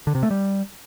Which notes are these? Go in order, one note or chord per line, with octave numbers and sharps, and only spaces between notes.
D3
C3
A3
G3